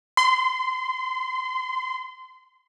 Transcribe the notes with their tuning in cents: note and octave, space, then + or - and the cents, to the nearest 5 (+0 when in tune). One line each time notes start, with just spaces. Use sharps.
C6 -25